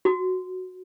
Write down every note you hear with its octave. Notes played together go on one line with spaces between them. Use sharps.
F#4